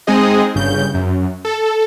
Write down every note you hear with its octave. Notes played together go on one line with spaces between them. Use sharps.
G#3 C4 D#4 G#4 D#5
G1 C#3 G6
F#2
A4